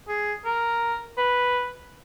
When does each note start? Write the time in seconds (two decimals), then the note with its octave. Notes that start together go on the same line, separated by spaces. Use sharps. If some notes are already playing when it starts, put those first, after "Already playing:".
0.08 G#4
0.45 A#4
1.17 B4